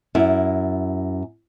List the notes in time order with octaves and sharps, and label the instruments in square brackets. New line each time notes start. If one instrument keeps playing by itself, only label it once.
[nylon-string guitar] F#2 E4